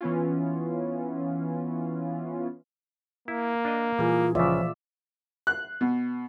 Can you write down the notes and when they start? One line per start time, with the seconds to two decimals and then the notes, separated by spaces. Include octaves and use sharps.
0.01 E3 B3 C#4 F4
3.28 A#3 E4
3.65 D4 D#5
3.99 A#2 E3 G3 F4 G#4
4.35 C#2 C#3 F3 F4 D5 E5
5.47 F#6
5.81 B2